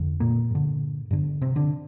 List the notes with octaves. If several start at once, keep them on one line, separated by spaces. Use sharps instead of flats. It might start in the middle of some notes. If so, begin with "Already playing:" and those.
Already playing: F2 D3
A#2 A#3
G2 D3
G2 D3
C3 C4
D3 D4